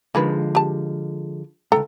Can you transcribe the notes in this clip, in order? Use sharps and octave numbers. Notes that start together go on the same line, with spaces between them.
D3 D#3 F3 G#3 G#4 B4
G4 A5
C#2 G#2 A4 G5 A#5